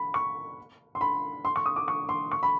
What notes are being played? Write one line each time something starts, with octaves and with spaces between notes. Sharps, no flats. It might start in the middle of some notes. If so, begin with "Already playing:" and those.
Already playing: B5
C#6
C6
B5
C6
C#6
D#6
D6
C#6
C6
C#6
B5